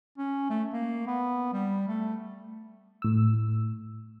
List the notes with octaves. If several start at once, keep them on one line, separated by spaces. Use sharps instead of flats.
C#4
A3
A#3
B3
G3
A3
A2 E6